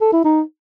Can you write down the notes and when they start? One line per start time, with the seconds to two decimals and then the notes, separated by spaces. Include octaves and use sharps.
0.01 A4
0.13 E4
0.25 D#4